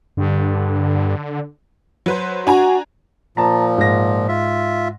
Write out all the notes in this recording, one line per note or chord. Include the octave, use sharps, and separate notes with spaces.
G2 D3
F#3 B4 C5
D4 F#4 G#5 A#5
A#2 F3 A5 A#5
G#2 A#6
F4 E5